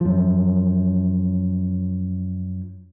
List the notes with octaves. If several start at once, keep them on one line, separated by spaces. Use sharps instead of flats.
F#2 F3